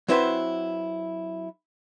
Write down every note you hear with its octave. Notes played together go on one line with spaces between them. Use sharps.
F#3 C4 E4 F#4 B4 C5